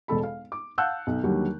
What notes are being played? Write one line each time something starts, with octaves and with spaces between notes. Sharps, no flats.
E1 B2 A4 B5
F5
D6
F5 F#5 A5 E6 F#6 G6
B1
D#2 D3 F#3 G3